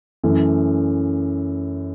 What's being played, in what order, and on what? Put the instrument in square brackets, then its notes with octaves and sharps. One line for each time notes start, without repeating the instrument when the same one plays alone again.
[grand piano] F#2 E3 A3